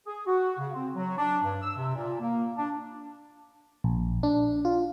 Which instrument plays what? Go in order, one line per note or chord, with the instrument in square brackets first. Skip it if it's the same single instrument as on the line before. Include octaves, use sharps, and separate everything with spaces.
[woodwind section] G#4
F#4
C#3
C4
F#3
D4
G2
E6
C3
A#2
A#3
D4
[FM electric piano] A#1
D4
F4